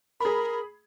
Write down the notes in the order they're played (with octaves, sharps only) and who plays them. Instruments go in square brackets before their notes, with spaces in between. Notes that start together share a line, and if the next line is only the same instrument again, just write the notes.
[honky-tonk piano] G#4 B5 [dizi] A#4